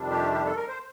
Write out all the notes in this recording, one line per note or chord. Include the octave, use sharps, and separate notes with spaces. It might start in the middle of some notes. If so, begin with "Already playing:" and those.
Already playing: F2 C3 D#3 G3 D4
G4
G4
A4
A#4
C5